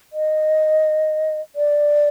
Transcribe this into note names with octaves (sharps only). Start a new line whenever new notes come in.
D#5
D5